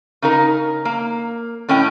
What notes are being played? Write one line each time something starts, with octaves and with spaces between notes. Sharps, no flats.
C#3 D#4 A#4
A#3
A2 C#4 D#5 G5